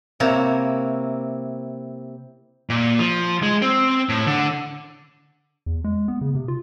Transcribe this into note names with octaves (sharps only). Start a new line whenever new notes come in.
C3 A#3 E4 C#5 A#5
A#2
F3
G#3
C4
A2
D3
E2
G#3
B3
C#3
C3
F4